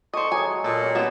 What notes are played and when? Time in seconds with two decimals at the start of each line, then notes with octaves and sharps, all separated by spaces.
0.14 A4 C5 D5 D#5 C#6
0.32 F#3 G#3 D#5 G#5
0.64 A#2 A4 C#7
0.83 C#4 G4 G5
0.95 G#3 B3 B4 D5 E7